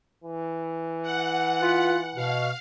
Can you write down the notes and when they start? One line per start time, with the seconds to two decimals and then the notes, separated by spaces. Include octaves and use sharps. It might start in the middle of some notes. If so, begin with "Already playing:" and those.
0.24 E3
1.03 F#5
1.61 F4 B4
2.15 B2 F5